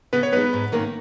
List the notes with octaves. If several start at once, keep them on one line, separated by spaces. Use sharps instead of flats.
C#3 B3 B4
C#5
G#3 B3 D#4 B4
G#2
D#3 A#3 C#4